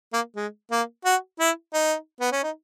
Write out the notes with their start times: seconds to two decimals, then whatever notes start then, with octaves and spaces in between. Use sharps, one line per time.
0.13 A#3
0.36 G#3
0.71 A#3
1.05 F#4
1.40 E4
1.73 D#4
2.21 B3
2.32 C#4
2.43 D#4